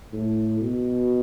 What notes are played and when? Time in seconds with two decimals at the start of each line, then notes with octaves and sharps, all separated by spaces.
0.13 A2
0.61 B2